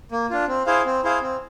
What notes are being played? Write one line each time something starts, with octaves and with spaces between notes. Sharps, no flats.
A#3
D4 F4
C4
E4 G#4 C5 F5
C4
E4 G#4 C5 F5
C4